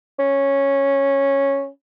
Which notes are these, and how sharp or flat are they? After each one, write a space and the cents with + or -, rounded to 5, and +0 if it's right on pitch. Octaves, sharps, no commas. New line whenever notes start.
C#4 -5